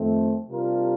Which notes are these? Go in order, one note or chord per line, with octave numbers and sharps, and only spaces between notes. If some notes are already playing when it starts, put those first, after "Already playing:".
Already playing: F2 D#3 A3 C4
C3 G3 D4 F4 A#4